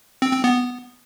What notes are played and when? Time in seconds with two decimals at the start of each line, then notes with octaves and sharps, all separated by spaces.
0.22 C4
0.33 C4
0.44 B3